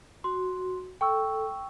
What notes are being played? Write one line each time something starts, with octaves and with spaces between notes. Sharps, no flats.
F#4 C6
A4 G5 C#6 E6